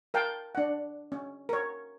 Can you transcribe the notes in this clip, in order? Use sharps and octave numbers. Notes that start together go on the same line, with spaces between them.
A#4 F5 G5 A5
D4 F#5
C#4
A#4 C#5